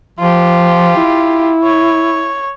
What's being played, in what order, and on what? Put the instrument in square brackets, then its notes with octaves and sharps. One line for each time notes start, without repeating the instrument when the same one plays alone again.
[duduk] F3 [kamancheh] F4 G4
[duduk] E4
[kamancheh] C#5